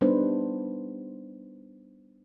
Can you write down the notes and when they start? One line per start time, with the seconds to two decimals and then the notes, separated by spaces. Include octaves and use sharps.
0.01 G3 B3 D4 D#4 B4 C5